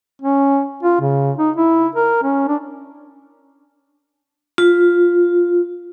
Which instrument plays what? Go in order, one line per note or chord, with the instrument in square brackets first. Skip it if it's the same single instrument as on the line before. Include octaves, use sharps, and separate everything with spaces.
[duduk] C#4
F4
C#3
D#4
E4
A#4
C#4
D4
[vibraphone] F4